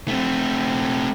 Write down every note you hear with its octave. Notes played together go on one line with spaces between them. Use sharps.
A3 C4